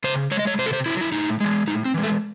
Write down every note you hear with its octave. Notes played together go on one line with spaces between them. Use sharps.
C#3 C5
G#3 C#5
D#5
C#5
C3 C5
A4
C5
F#3 E4
E4
A2 D#4
E3 G#3
A2 D#4
C4
E3 G#3
A3